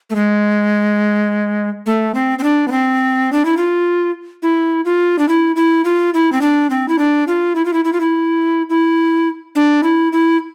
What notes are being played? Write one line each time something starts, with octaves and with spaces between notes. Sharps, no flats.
A3
G#3
A3
C4
C4
D4
B3
C4
D4
E4
F4
E4
F4
D4
E4
E4
F4
E4
C4
D4
C4
E4
D4
F4
E4
F4
E4
E4
F4
E4
E4
D4
E4
E4